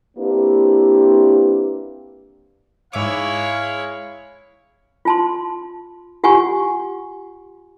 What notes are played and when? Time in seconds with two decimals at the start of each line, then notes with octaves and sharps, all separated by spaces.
0.17 A#3 C4 D4 E4 G4 B4
2.93 G#2 G#3 E4 C#5 E5 F5 D6
5.05 F4 A5 C6
6.24 F4 G4 F#5 G#5 C#6